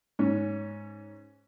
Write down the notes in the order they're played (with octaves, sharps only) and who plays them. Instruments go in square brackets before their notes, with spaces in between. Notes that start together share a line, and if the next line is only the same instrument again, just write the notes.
[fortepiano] G#2 C#4